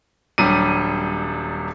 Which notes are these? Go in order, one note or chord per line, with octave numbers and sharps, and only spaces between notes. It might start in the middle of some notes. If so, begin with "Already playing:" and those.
D#1 F#3 G3 D4 D#7